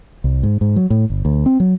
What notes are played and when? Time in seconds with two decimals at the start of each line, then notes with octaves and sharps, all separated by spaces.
0.24 C2
0.43 G#2
0.61 G#2
0.76 F#3
0.90 A2
1.10 G1
1.25 D2
1.46 C4
1.60 F#3